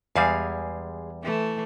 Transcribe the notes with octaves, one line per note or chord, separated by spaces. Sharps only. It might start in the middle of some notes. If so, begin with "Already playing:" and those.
E2 G3 G#3 G#4 F5
E3 A3